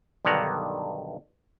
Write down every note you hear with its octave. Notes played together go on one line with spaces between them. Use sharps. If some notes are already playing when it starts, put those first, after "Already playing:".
B1 G2 D3 D#3 F#5 A#5